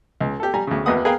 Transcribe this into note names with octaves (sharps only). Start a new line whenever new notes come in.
C#2
G4 A4
G3 G#5 A#5
D2 C#3
G#1 E2 A#3 B4 F#5 D#6
G#4 A#4 B4 F5 G5